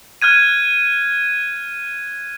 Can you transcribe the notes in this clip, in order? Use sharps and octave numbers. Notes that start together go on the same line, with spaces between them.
F6 F#6 G#6 D#7